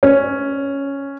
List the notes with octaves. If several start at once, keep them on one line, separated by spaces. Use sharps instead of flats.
C#4